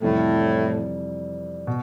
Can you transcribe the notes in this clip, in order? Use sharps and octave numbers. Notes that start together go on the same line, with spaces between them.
F2 A2 C3 E3 G3
B2